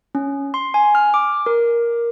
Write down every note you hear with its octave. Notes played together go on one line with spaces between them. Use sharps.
C#4
C6
G#5
F6
D6
A#4